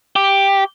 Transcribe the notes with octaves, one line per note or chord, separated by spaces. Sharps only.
G4